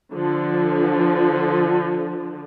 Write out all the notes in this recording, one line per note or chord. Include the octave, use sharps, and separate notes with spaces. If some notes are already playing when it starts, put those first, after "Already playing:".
D3 F3